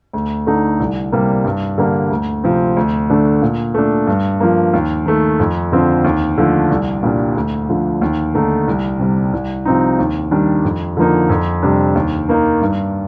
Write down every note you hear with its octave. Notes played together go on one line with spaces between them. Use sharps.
D2
D3 A3 D#4
C2
C3 G3 A#3
G2
D3 G3 A#3
D2
C3 F3 C4
D2
D3 A3 D4
A#2
A3 D4
G2
F3 A#3
D#2
D#3 A3
F2
D3 F3 C4
D#2
D3 F3 A3
C2
A#2 G3 D4
D2
D3 F3
D#2
D3 A3 D#4
C2
C3 G3
C2
C3 F3 C4 D#4
D#2
D#3 G3 D4
F2
D3 F3 A#3 D#4
F2
C3 G3 D4
D#2
D#3 A#3 D#4
G2